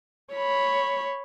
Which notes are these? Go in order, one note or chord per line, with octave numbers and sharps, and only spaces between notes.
C#5 B5